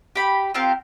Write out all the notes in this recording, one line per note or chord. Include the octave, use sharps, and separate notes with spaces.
G4 B5
C4 F4 G4 A#4